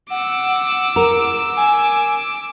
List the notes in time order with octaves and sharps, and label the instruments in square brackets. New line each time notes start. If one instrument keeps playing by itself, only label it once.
[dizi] F#5 [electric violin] D6 E6
[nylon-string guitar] A#4
[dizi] G#5